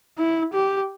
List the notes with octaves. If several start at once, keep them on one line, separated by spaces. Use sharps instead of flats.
E4
G4